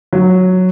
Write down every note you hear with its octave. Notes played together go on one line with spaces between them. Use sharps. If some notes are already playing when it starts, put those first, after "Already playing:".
F#3